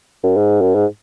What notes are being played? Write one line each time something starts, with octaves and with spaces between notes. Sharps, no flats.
F#2
G#2
F#2
G#2